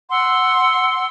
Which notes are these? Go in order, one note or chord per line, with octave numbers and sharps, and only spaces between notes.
F#5 C6 E6